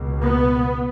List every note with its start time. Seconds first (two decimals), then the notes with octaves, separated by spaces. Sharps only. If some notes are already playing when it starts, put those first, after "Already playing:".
Already playing: C#2 B2
0.20 B3